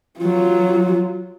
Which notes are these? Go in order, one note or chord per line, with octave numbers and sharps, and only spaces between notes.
F#3 F4